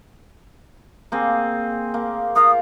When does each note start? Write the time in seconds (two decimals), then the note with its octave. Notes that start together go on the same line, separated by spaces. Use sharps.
1.12 A#3 C4 G#4
1.94 A#3
2.36 F4 A#4 D#6